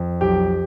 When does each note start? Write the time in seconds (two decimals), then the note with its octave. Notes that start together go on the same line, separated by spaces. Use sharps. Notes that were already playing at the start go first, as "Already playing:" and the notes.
Already playing: F2
0.21 B1 G4